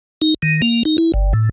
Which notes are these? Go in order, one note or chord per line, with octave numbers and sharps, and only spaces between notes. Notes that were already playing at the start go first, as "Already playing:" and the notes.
D#4
D#3
A#3
D#4
E4
G1
A2